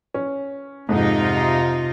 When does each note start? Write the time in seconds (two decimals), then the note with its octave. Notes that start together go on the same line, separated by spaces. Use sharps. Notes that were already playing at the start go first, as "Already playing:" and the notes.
0.14 C#4
0.89 F2 G#2 C3 D#4 F4